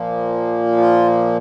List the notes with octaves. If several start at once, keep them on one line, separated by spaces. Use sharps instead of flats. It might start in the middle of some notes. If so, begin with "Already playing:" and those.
Already playing: A#2 F3 A#3
F4